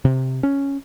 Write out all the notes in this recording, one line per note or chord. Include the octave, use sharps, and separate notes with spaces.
C3
C#4